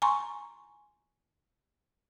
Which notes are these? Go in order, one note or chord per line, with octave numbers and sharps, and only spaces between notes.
G#5 A#5 C6 C#6